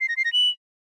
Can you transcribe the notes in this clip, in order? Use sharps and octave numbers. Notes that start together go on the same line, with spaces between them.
C7
A#6
C7
A#6
F#7